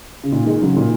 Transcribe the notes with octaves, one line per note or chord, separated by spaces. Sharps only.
C#3
A#2 D#3
D#3 G#3
C#3 F#3
A#2 D#3